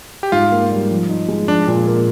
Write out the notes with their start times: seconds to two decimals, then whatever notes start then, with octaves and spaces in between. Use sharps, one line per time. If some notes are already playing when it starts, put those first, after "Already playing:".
0.23 G4
0.32 G#2 F4
0.51 A#3
0.71 G3
0.91 F3
1.09 D#4
1.28 G#3
1.48 F3 D4
1.68 A#2
1.87 A#3